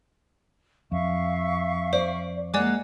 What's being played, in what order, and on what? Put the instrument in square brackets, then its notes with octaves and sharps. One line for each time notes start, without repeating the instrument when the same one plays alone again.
[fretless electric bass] F2 [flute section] E5 F5 C#6
[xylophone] C5 [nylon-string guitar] D5
[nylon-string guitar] G#3 A#3 [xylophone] D5 G#5 D6 [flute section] F#5 F#6